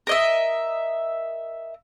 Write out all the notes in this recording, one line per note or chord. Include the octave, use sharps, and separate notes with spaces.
A#4 D#5 E5